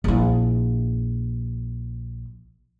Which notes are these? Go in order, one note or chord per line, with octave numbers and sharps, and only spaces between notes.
A#1 E4